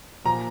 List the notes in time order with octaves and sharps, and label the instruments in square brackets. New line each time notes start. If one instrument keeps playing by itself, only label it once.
[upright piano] A#2 F3 A#5